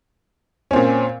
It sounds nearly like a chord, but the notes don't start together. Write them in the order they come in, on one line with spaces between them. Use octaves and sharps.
C#4 C4 A#2